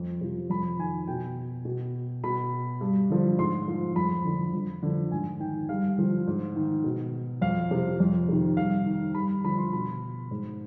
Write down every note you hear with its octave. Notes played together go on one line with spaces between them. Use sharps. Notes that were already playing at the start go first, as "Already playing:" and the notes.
Already playing: F2
C3 F3
F2 B5
D#3 G#5
B2 G5
B2
B2 B5
G2
D3 F3
G#2 C6
F3
F2 B5
D3 F3
F2
D3 F3
G#2 G#5
D#3 G5
G2 F5
D3 F3
G#2
D#3
B2
F2 F5
C3 F3
F2
C3 D#3
G2 F5
D#3
G2 B5
D3 F3 B5
C6
B2 B5
G#2